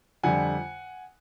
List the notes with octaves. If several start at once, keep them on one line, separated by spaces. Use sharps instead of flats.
F2 D3 G3 F#5 G#5